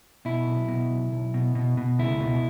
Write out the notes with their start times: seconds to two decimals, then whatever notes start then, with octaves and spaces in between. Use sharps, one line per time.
0.25 B2 E4
0.47 B1
0.68 B2
0.91 B1
1.12 B1
1.34 B2
1.55 B2
1.77 B2
1.98 C#2 E4
2.20 B2